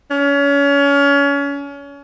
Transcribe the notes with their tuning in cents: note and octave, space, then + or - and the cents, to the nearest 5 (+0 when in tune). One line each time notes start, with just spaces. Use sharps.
C#4 +30